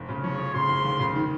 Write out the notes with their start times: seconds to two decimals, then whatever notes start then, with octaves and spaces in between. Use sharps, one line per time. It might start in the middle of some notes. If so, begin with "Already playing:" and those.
Already playing: F1
0.09 C#3
0.23 F3 C#5
0.38 F3
0.54 C#3 C6
0.69 F1
0.84 D#2
1.00 C#3
1.15 D#3